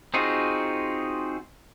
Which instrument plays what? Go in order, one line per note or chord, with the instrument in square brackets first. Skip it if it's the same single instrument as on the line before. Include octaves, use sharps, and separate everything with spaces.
[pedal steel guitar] C4 D#4 F4 F#4 G#4